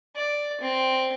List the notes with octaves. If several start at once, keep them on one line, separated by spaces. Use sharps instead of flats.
D5
C4